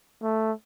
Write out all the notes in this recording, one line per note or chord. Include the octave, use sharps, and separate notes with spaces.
A3